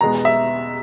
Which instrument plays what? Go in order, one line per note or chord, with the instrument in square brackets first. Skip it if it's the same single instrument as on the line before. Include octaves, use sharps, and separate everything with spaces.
[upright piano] E2 B2 G#3 B3 A#5
E5